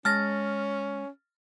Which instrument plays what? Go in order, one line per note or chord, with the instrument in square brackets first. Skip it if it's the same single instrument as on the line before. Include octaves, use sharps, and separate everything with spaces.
[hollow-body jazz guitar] G#3 A5 [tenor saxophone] C#4 [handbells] F6 A6 A#6